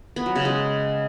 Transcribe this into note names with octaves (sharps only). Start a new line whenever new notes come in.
B3
F#3
C#3
G#3